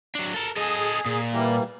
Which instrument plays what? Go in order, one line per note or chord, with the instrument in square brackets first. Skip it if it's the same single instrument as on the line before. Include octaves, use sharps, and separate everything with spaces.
[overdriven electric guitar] F#3 D4
A4 A#4
[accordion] G#4 [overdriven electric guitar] A4 D#5
[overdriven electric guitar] A#2
[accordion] E3 G3 A#3